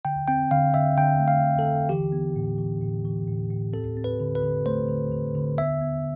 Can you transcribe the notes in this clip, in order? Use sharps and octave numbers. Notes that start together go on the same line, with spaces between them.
D3 G5
C4 G5
D3 F5
D3 E5
D3 G5
A3
F5
D3
A4
D3
E3 G4
B3
A2
E3
A2
E3
A2
A2
C4 A4
C4
B4
D3
B4
D3
A3 C5
D3
D3
D3
B3 E5
B3